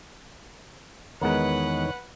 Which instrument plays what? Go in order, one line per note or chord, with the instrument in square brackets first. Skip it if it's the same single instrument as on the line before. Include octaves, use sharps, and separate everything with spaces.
[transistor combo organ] E2 D#3 C#5 [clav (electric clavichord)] G#3 B3 A#4 [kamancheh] B4 F#5